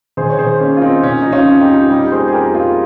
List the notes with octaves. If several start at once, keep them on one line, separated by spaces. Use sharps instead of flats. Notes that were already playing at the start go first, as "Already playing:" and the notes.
D#3 G#4 C5
C#5
D#3 G#4 C5
A#3 C#4
F4
A#3 C4 D#4
C#3 C#4
F3 D#4
C#4 F4
F2
D#4 G4
F3
G3 D#4 G4
A#3 G#4 C5
G#4
F2 G4 A#4
G3 F4 G#4